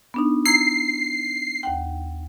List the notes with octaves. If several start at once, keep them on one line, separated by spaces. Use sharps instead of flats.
B3 D4 D#4
E4 A#5 G#6 C7
D#2 F#5 G5